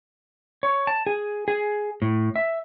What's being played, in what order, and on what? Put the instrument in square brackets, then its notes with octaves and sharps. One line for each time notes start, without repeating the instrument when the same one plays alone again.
[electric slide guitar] C#5
A5
G#4
G#4
A2
E5